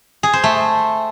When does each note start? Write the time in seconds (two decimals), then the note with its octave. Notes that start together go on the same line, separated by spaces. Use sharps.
0.23 G#4
0.33 C5
0.44 A3